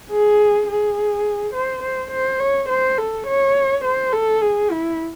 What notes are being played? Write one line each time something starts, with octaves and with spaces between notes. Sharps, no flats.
G#4
G#4
C5
C5
C5
C#5
C5
A4
C#5
C5
A4
G#4
E4